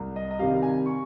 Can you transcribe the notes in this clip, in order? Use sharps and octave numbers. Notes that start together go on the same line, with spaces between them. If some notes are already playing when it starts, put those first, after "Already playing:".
Already playing: C2
D#5
D#5
C3 D#3 G3 F5
G#5
C#6